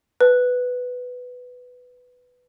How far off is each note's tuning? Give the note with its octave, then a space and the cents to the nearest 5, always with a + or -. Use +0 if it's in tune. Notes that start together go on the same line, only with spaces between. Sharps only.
B4 +5